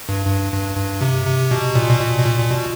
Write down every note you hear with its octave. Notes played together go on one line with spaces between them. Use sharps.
G2
G2
G2
G2
C3
C3
B2
A#2
B2
A#2
B2
A#2
A#2
B2